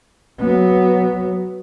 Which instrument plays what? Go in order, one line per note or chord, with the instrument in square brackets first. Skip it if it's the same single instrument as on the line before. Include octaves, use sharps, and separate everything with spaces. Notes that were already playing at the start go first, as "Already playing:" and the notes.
[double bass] F#3 B3